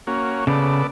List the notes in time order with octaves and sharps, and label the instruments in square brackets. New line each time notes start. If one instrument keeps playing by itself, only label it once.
[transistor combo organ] A#3 C#4 F#4
[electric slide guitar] C#3 [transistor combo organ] B3 A4 D5